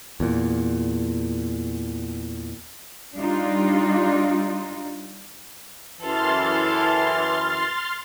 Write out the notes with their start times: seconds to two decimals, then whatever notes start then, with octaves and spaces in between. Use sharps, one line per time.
0.20 E2 A#2
3.16 G3 D4 D#4 F4
6.01 F#2 E3 A4 A5 C6 F6 A6